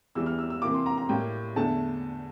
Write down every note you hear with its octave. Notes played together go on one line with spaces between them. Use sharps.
E2 E3 G3 E6
F6
E6
E6
F2 C3 E3 A#3 D6
C6
A#5
A#5
A2 G3 A#3 G5
E2 D3 A3 A5